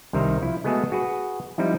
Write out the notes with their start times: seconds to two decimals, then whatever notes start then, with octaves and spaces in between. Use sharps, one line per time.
0.13 C2 D#3 G3 C5 E5 A#5
0.42 F3 E4
0.64 G#3 A3 B3 F#4 G#4 A4
0.92 F#4 G#4 B4
1.58 F3 G3 C4 D#4 E4